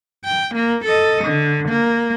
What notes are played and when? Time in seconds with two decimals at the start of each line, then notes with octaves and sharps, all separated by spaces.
0.24 G5
0.55 A#3
0.85 A4 D#5
1.25 D3
1.69 A#3